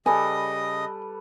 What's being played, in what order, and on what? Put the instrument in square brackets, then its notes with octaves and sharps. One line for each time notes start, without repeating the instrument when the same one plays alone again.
[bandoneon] C#3 D#5 D#6 [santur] G3 A4 B4 [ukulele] G#5